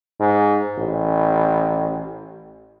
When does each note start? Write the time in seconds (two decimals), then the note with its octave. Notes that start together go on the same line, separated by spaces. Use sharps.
0.20 G#2
0.78 A1